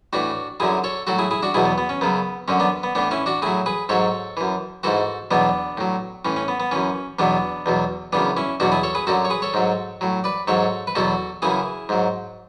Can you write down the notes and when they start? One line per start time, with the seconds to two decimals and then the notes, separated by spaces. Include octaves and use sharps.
0.13 A2 E3 D4 F#4
0.60 F#2 D3 F#3 E4 G#4
0.84 A4 C#5
1.07 A2 F#3 F#4 A4
1.18 E4 G#4
1.31 E4 G#4
1.43 D4 F#4
1.54 E2 B2 F#3 E4 G#4
1.65 B3
1.78 B3
1.89 C#4
2.01 F#2 C#3 F#3 B3
2.48 F#2 D3 F#3 C#4
2.60 B3 D4
2.83 B3
2.95 A2 E3 B3 D4
3.11 C#4 E4
3.26 D4 F#4
3.42 A2 F#3 E4 G#4
3.66 G#4 B4
3.89 G#2 F#3 A4 C#5
4.37 F#2 E3
4.83 G#2 E3 F#4 A4
5.31 E2 B2 F#3 B3 D4
5.77 A2 F#3
6.25 A2 E3 C#4
6.36 C#4
6.48 B3
6.60 B3
6.71 F#2 E3 C#4
7.19 E2 B2 F#3 B3 D4
7.66 E2 B2 F#3
8.13 F#2 C#3 E3 B3 D4
8.37 C#4 E4
8.60 E2 B2 F#3 D4 F#4
8.72 E4 G#4
8.83 A4 C#5
8.95 G#4 B4
9.07 F#2 D3 F#3 F#4 A4
9.25 C#5
9.30 G#4 B4
9.42 A4 C#5
9.54 G#2 F#3
10.01 A2 F#3
10.24 B4 D5
10.48 G#2 F#3 A4 C#5
10.87 B4
10.95 E2 B2 F#3 F#4 A4
11.42 F#2 C#3 E3 E4 G#4
11.89 G#2 F#3